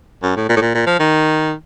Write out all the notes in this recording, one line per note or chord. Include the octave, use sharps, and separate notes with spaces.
F#2
A2
A#2
A2
A#2
A#2
F3
D#3